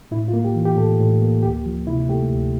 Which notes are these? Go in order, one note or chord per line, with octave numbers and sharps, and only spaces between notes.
A2 E4
F4
A#3
G4
E3
G4
A2 A4
A2
A#3
D2 G4
F3
C3 E4
A3 G4
D2